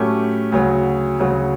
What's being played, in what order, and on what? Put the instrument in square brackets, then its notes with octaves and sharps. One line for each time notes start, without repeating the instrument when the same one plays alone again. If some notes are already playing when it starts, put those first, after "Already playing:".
Already playing: [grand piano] A2 F#3 A3 C#4 G4
D2 C#3 F#3
D2 C#3 F#3